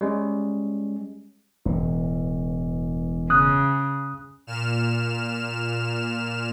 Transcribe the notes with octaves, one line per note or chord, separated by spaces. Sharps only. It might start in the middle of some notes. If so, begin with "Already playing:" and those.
G3 G#3 C#4
E1 A2 E3
C#3 D#6 F#6
A#2 F6 E7